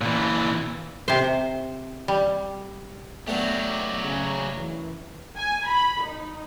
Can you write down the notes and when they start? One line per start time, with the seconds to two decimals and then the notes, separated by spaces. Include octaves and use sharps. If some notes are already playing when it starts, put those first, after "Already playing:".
0.01 A#2 E3
1.08 C3 C5
2.08 G3
3.27 F#3 A3 B3 D4 F#4 G4
3.71 B2 B3
4.03 C#3
4.56 F#2 E3
5.37 G#5
5.68 B5
6.02 D#4